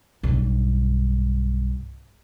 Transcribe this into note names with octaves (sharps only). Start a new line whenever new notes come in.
B1 G2